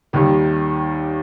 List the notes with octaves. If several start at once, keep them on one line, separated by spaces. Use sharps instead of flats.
D#2 D#3 G3